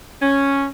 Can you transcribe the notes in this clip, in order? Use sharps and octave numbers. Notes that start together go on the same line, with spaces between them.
C#4